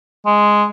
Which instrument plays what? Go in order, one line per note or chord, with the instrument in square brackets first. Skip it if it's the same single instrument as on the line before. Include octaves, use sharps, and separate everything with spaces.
[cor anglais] G#3